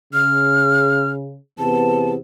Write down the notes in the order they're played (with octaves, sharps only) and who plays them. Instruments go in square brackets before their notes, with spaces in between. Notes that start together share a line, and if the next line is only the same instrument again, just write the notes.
[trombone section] C#3 [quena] F6
[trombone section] E2 C3 B3 [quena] A5